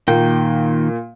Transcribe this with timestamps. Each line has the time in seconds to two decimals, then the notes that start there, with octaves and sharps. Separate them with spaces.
0.08 A#2 D#3 A#3 G5